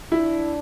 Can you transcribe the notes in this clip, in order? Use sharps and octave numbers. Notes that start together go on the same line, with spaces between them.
D4 E4